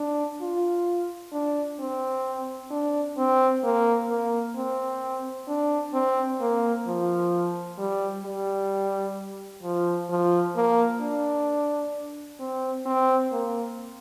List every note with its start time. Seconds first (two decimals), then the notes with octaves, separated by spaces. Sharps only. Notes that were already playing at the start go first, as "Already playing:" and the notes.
Already playing: D4
0.41 F4
1.32 D4
1.79 C4
2.71 D4
3.18 C4
3.63 A#3
4.10 A#3
4.56 C4
5.48 D4
5.94 C4
6.41 A#3
6.87 F3
7.78 G3
8.25 G3
9.63 F3
10.09 F3
10.56 A#3
11.01 D4
12.40 C4
12.86 C4
13.32 A#3